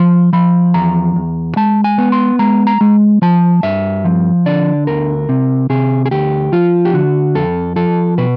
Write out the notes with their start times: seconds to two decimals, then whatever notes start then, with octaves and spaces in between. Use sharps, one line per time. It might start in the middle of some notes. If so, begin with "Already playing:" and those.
Already playing: F3 C6
0.33 F3 B5
0.74 E2 A#5
1.16 E2
1.56 G#3 A5
1.84 G#5
1.98 B3
2.12 C6
2.39 G#3 A#5
2.67 A#5
2.81 G#3
3.22 F3 A5
3.63 G2 E5
4.04 F3
4.46 D3 D5
4.87 D2 A#4
5.29 C3
5.70 C3 G#4
6.06 G#4
6.11 D2 G4
6.52 F3 F4
6.85 G4
6.94 D3 F#4
7.35 F2 A4
7.76 F3 A4
8.18 B2 B4